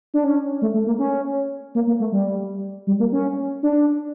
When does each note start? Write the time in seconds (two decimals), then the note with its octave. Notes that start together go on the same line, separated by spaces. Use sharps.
0.14 D4
0.24 C#4
0.62 A3
0.74 A3
0.87 A#3
0.99 C#4
1.75 A#3
1.87 A#3
2.00 A3
2.12 G3
2.87 G3
3.00 A#3
3.12 C#4
3.63 D4